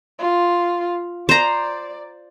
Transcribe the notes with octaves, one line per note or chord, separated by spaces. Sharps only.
F4
C5 D5 A#5